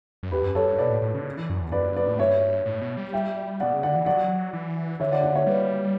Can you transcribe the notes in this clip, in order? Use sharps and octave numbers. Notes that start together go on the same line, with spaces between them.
F#2
E2 G4 B4
F#2
F#2 A4 C#5
G2
B2 B4 D5
A2
A2
C#3
D3
C#3
E3
F#2
E2
F#2 B4 D5
B4 D5
A2
G2 C#5 E5
A2
B2
G3
E5 G5
B2 D5 F#5
C#3
D3 D5 F#5
E3
F#3 D5 F#5
E3
D3 C#5 E5
D5 F#5
D5 F#5
C#5 E5
G3 B4 D5